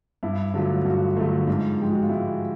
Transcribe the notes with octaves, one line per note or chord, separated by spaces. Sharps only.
G2 E4
D3 F#3 A3 F4
G2 F#4
D3 F#3 A3 F4
G#2
F3 G#3 G4
F#4
F4
G#2 E4